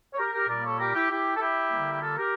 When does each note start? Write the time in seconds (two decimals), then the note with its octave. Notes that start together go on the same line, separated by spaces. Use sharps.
0.14 C#5
0.18 G4 A#4
0.34 G4 A#4
0.49 A#2 G3 A#3 A#4 D5
0.64 A4 C#5
0.80 G4 A#4
0.95 E4 G4
1.11 E4 G4
1.37 A4
1.41 E4 G4
1.72 D3 G3 A#3
1.92 G4
2.03 F4 A4
2.18 G4 A#4